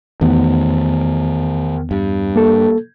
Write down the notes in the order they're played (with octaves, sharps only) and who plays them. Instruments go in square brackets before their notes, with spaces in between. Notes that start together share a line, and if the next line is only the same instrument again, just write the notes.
[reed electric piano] E2 B3 [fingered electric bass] D#3 A3
[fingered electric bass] G2
[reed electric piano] A#3 A4